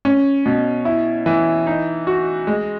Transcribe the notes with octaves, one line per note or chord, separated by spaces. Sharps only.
C#4
B2
E4
E3
D#4
F#4
G#3